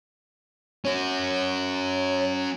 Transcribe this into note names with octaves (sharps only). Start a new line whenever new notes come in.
C#4 F#4 C#5